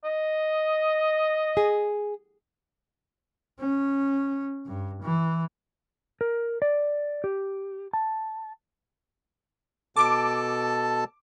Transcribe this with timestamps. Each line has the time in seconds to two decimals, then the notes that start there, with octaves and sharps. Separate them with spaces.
0.04 D#5
1.57 G#4
3.59 C#4
4.66 G2
5.02 E3
6.21 A#4
6.62 D5
7.24 G4
7.93 A5
9.96 B2 A4 A5 D6